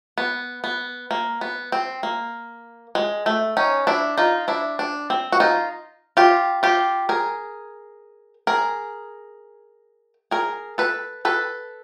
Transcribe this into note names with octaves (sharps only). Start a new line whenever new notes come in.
B3
B3
A#3
B3
C4
A#3
G#3
A3
C#4 D#4
D4 E4
D#4 F4
D4 E4
D4
C4
F#4
D#4 F4
F4 G4
F4 G4
G#4 A#4
G#4 A#4
G#4 A#4
A4 B4
A4 B4